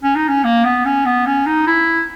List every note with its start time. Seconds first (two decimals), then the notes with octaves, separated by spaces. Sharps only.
0.03 C#4
0.16 D#4
0.28 C#4
0.44 A#3
0.65 B3
0.85 C#4
1.06 B3
1.26 C#4
1.46 D#4
1.67 E4